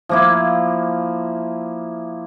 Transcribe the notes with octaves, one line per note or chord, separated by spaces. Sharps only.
F3 A#3 E4